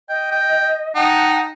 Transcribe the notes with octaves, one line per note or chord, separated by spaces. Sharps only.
D#5 G5
G5
D#4 F#5 G5 A5